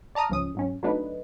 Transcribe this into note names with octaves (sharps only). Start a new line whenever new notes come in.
D5 A5 A#5 D#6 F6
G#1 C#2 F3 C#4 D#6
G#2 F#3 C#4
F#3 A3 B3 D4 D#4 B4